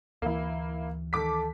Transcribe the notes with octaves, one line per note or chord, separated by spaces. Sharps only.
D2 E3 A#3 E4
D#3 A4 D6 B6